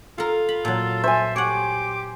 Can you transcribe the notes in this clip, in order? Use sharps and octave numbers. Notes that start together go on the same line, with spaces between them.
F4 A4 A#4
B5
A#2 F#3 A4
C5 E5 G#5
G4 C#5 F#5 D6